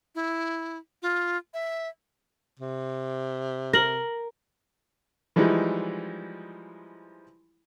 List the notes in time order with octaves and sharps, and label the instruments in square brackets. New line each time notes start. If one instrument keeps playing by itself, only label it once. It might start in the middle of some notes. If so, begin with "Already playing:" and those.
[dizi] E4
F4
E5
[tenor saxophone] C3
[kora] A#4 [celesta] A#6 F#7
[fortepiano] E3 F3 G3 G#3 D#4 E4